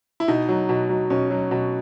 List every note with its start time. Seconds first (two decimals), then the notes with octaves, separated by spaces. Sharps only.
0.20 E4
0.28 B2 D#4
0.49 F#3
0.69 B2
0.89 F#3
1.10 B2 C#4
1.31 F#3
1.51 B2